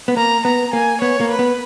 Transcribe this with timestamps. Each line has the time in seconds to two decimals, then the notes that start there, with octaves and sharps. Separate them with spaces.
0.08 B3
0.17 A#3 A#5
0.45 B3 A#5
0.73 A#3 G#5
1.01 B3 C#5
1.21 A#3
1.30 B4
1.39 B3